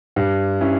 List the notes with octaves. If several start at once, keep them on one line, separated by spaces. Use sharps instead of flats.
G2
G3 C#4 E4